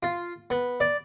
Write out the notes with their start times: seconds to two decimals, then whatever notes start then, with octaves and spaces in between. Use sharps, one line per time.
0.03 F4
0.50 B3
0.80 D5